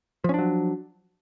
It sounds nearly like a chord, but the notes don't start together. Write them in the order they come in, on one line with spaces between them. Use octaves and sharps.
F3 C#4 D4 F#3